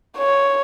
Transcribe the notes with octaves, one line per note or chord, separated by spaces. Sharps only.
C#5